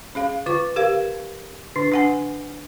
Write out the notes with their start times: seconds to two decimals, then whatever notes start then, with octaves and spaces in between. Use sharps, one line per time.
0.15 C#4 G#4 F5
0.46 D3 F4 C#6
0.76 G4 A#4 F5
1.76 D3 D4
1.92 D4 F#5 G#5